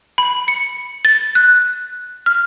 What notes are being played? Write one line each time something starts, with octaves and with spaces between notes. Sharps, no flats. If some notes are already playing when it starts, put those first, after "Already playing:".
B5
C#7
A6
F#6
F6